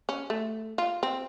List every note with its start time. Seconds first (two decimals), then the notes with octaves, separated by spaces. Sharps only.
0.09 C#4
0.30 A3
0.78 F4
1.03 C4